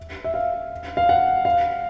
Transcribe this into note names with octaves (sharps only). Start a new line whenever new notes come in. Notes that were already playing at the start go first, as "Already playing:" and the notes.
Already playing: E5
E5
F5
F5
F#5
F5